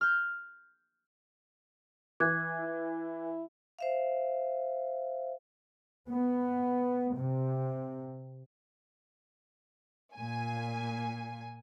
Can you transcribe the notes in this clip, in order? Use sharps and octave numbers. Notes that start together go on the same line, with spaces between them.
F6 G6
E3 D6 F#6 G#6
E4
C5 E5 F5
B3
C3
A#2 G#5